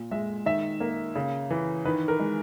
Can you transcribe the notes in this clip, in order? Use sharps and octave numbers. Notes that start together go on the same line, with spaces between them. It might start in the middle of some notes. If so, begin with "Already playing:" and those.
Already playing: A#2
G#3 E5
D#3 E5
A#3
C#3
E3
D#3 B4
A#4
G#3